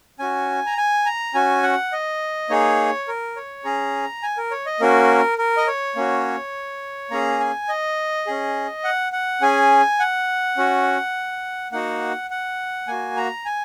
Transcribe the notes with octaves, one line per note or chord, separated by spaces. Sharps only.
C#4 F#4 G#5
A#5
G#5
A#5
C#4 F#4 G#5
F#5
D#5
A#3 D#4 G#4 C#5
A#4
C#5
C#4 G#4 A#5
G#5
A#4
C#5
D#5
A#3 C#4 F#4 A#4
A#4
D#5
C#5
A#3 C#4 F#4
A#3 C#4 G#4 A#5
G#5
D#5
C#4 G#4
F#5
F#5
C#4 G#4 G#5
F#5
C#4 F#4
A#3 D#4 F#4 F#5
F#5
A#3 F#4 G#5
A#5
G#5